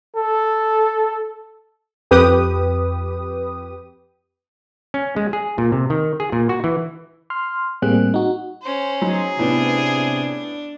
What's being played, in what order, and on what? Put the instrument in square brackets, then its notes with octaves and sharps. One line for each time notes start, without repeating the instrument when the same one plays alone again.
[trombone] A4
[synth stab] F2 G4 B4 D#6
[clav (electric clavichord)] C#4
G#3
G#4
A#2
C3
D#3
G#4
A#2
F#4
E3
[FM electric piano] C6 F6
A2 G3 A#3 C4 G#4 F#6
D#4 F#4
[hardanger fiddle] C#4 C5
[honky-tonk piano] F#3 [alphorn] D#4 [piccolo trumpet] G#4
[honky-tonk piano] A2 B3 C#4 [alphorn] C3 [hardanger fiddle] D4